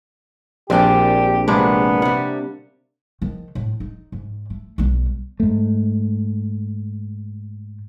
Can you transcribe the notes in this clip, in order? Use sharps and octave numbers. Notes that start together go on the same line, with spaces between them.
A#1 G3 C4 D4 G4 G5
C3 G#3 A#3 B3 D4
C3 G3 F#5
D#3 F3
A2
D#4
G#2
A3
B1 G3
G#2 A3